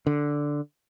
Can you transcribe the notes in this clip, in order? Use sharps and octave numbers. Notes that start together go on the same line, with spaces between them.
D3